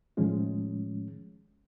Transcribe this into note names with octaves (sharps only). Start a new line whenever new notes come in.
A2 D#3 F3 G#3 C#4